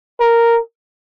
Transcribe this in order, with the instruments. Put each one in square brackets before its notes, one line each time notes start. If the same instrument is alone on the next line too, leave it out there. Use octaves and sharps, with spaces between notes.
[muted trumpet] A#4